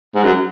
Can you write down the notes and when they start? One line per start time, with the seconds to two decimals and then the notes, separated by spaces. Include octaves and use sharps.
0.15 G#2
0.23 F#2